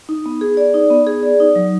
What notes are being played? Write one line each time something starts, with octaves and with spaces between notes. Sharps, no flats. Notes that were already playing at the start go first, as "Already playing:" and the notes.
D#4
B3
G#4
D5
D#4
B3
G#4
D5
D#4
F#3